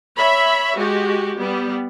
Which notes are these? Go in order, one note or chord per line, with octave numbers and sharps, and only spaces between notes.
C#5 E5 B5
G#3 F#4 G4
G3 B3